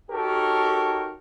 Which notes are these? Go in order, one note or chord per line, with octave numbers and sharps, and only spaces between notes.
D#4 F#4 G4 A4 A#4 C#5